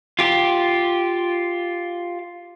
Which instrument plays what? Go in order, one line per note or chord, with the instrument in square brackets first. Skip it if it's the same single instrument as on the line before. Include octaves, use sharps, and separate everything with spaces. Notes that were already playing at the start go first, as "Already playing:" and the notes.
[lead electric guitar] F4 G4